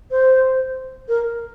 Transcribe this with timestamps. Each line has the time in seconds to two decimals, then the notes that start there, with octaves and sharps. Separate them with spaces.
0.11 C5
1.08 A#4